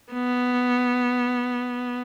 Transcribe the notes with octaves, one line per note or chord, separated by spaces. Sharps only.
B3